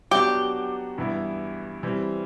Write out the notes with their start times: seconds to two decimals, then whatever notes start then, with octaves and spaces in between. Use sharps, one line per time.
0.11 F#3 B3 D4 F#4 G4
0.98 G2 E3 B3 E4
1.83 E3 G3 C4